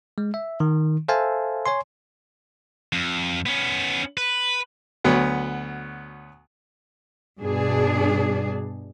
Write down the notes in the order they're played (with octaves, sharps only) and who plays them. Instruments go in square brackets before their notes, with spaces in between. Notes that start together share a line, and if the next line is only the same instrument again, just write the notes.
[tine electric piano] G#3
E5
D#3
A4 C5 E5 F5 G#5 A5
C#5 G#5 C6
[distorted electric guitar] F2
B3 C#4
B4
[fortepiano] D2 F#3 B3
[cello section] G2 B2 D4 G#4